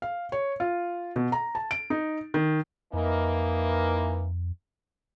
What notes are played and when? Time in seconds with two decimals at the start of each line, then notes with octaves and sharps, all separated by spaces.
0.02 F5
0.32 C#5
0.60 F4
1.16 B2
1.32 A#5
1.55 A5
1.71 D7
1.90 D#4
2.34 D#3
2.93 F2 E3 A#3 D#4